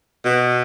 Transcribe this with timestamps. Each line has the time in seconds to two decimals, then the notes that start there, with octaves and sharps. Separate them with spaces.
0.25 B2